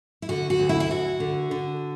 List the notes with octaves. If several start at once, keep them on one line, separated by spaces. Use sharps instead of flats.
E4
D3 F#4
F#4
D2
E4
E4
D2 F#4
D3
D3